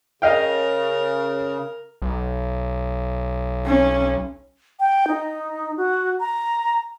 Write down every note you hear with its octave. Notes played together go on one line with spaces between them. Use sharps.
C#3 A#4 D#5 F5 G5
B1
C#4
G5
D#4
F#4
A#5